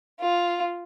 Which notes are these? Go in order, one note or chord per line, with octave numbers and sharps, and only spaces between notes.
F4